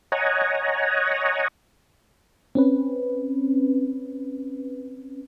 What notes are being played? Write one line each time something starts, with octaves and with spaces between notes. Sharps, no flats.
C#5 D#5 F#5 G#5 A#5
C4 C#4 B4